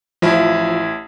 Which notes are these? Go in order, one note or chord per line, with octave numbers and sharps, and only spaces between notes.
A1 F3 E4